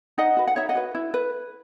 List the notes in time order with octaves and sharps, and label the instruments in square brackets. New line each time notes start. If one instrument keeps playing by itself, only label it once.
[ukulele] D#4 D#5 F#5
F#4 B4
F#5
D#4 C#5 E5
D#5 F#5
F#4 B4
E4
B4